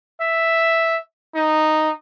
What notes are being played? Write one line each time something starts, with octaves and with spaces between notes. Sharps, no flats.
E5
D#4